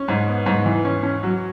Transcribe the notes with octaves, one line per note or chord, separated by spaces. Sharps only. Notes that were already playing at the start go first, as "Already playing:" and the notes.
Already playing: C#4
G#2
B3
G#2
E3
C#4
C#4
F#3